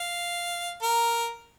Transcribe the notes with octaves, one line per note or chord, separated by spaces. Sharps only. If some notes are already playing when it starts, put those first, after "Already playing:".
Already playing: F5
A#4